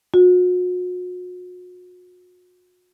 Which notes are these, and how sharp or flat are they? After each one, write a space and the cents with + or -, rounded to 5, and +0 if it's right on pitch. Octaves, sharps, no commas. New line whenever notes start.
F#4 -40